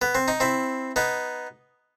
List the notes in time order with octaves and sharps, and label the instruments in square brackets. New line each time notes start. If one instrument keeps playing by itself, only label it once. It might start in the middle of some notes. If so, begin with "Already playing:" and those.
[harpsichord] B3
C4
D#4
C4 E4
B3 D#4